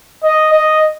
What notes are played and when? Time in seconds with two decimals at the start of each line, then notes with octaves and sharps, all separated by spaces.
0.23 D#5
0.53 D#5